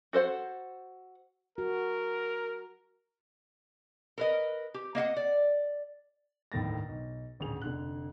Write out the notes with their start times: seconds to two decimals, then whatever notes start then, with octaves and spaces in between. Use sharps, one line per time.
0.13 F#4 A4 C5 F#5
1.58 F#4 A#4
4.18 A#4 B4 D#5
4.74 G4
4.95 A#3 D#5 F5 F#5
5.17 D5
6.52 G1 D#2 A2 A6 A#6
6.88 B1
7.39 D#1 A1 D2 G#4 F7
7.62 F1 D3 F#6